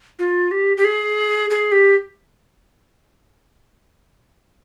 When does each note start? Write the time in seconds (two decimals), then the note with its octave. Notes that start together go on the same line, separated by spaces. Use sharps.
0.19 F4
0.51 G4
0.77 G4
0.85 G#4
1.50 G#4
1.72 G4